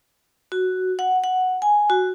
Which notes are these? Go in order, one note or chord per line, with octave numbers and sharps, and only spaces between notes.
F#4
F#5
F#5
G#5
F#4